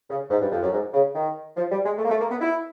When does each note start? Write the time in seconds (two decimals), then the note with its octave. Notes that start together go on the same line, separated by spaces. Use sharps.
0.10 C#3
0.30 G#2
0.41 G2
0.51 F2
0.62 F#2
0.72 G#2
0.94 C#3
1.15 D#3
1.57 F3
1.71 G3
1.85 G#3
1.98 A3
2.04 A#3
2.10 A3
2.20 A#3
2.30 B3
2.41 E4